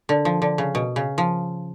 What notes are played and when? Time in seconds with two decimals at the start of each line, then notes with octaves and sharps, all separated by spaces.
0.09 D3
0.25 F3
0.42 D3
0.58 C#3
0.75 B2
0.96 C#3
1.18 F3